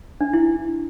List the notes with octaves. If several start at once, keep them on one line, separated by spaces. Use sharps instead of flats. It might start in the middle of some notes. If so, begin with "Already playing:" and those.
D4
E4